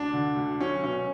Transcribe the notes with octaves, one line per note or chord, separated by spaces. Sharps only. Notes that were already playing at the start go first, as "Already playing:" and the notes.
Already playing: D2 D4
D3
D2
F#3 C#4
B2 C#4